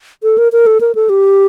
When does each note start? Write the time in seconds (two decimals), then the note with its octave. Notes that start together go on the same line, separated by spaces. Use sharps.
0.23 A4
0.38 A#4
0.52 A#4
0.66 A4
0.81 A#4
0.95 A4
1.09 G4